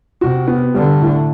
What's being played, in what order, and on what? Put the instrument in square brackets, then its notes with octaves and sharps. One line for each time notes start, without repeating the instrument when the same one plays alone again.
[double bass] C3 [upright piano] F#4
[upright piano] B3
[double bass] D3 [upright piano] G3
[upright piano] A2